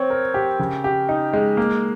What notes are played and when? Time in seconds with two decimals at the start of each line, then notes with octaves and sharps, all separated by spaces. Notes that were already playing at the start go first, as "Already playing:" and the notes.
Already playing: C4 C#5
0.10 A#4
0.34 G4
0.59 C#3
0.84 G4
1.09 D#4
1.33 G#3
1.57 A#3